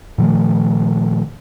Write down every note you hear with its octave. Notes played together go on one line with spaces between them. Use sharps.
A#2 D#3 F3 A3